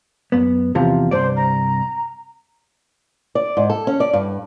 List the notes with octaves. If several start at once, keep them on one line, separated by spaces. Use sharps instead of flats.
F#2 B3
E2 C3 F3
C2 G2 C5 D5
A#5
D5
G#2
A4
C#4
D5
G2